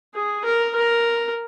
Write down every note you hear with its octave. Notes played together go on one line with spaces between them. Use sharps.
G#4
A#4
A#4